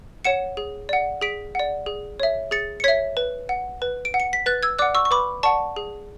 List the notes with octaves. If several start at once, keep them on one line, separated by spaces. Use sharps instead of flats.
C#5 F#5 C#7 E7
G#4
D5 F#5
G#4 B6 D7
D5 F#5
G#4
C#5 E5
G#4 A6 C#7
C#7
C#5 E5 G#6 B6
B4
F#5
B4
D7
F#5
C#7
B6
B4 F#6 A6
E6 G#6
D5 F#5 D6 F#6
C#6 E6
C#6
B4 B5 D6
D5 F#5 A5 C#6
G#4